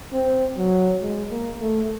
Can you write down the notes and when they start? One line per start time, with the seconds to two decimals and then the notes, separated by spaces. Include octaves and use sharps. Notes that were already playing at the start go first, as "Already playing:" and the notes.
0.13 C4
0.57 F#3
1.02 G#3
1.31 A#3
1.61 A3